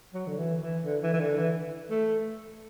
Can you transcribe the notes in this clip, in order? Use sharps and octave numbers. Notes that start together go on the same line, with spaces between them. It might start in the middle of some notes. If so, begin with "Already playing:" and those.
F#3
D3
E3
E3
D3
E3
E3
D3
E3
A3